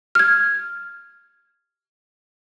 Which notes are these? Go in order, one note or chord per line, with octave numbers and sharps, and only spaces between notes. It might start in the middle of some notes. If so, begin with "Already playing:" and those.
F6 G#6